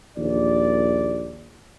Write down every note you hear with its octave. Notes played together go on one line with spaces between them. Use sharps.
A#1 D#2 D5